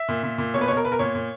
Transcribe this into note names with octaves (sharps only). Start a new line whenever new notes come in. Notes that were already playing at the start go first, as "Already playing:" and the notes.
Already playing: E5
A#2
A#2
A#2
B2 C#5
B4
B2 C#5
A#4
B2 B4
A#4
A#2 C#5
A#2